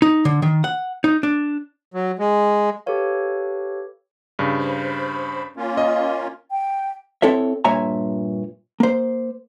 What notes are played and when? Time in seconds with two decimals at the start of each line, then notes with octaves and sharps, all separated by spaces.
0.02 D#4
0.25 D3
0.42 D#3
0.64 F#5
1.04 D#4
1.23 D4
1.94 F#3
2.19 G#3
2.86 G4 A4 B4 C#5 F5
4.39 G2 C#3
4.59 C5 B5
5.56 A#3 C#4 F4
5.77 D#5
6.51 G5
7.22 C4 E4 A4 C#5 E5
7.64 G2 A#2 C#5 E5 G#5 A#5
8.80 A#3 C5